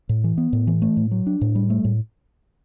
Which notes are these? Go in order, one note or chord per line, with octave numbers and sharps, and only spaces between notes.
A2
E3
B3
A2
E3
A3
A2
F#3
D4
A2
G3
A3
A2